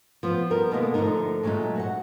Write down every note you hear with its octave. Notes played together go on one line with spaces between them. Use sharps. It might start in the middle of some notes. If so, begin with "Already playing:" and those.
F3 B3
G3 B3 A#4
B2 D3 D#3 G#3 A#3 B3
D3 F3 A3 D#4 A#4
A#2 F#3 G#3 A3 D#4
F#4 B4 F#5